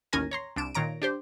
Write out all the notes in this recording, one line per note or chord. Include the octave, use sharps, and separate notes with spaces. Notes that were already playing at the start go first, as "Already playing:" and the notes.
A1 D#2 C#4 A#4 G#5 A#6
C#5 A#5 C6
C2 D4 D7 E7
A#2 D#3 C#5 A#5 D7
D4 G4 C5